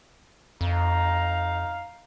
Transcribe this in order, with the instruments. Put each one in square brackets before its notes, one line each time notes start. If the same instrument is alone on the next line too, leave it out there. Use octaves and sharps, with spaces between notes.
[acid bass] F2 [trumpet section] D#4 F5 A#5